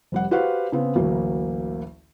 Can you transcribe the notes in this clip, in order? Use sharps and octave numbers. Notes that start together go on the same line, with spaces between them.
F1 G3 F#5
F#4 G4 B4 C5 F5 F#5
C#3 B3 C4
A1 D2 F#3 A#3